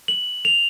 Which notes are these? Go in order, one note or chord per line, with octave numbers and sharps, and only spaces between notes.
F#7
F7